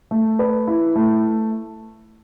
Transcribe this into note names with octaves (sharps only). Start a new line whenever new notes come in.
A3
B4
E4
A3